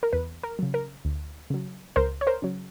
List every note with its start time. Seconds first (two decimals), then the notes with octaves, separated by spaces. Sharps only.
0.03 A#4
0.13 E2 B4
0.43 A#4
0.59 C#3 F#3
0.74 A#4
1.05 D2
1.50 C#3 F#3
1.96 C#2 A#4 C5
2.21 C#5
2.27 A#4 C5
2.42 C#3 F#3